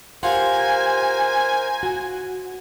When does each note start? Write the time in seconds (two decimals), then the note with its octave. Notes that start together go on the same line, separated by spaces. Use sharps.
0.23 F4 G4 A#4 C5 F5 F#5 G#5
1.83 F#4